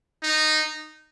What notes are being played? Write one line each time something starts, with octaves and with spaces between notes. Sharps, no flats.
D#4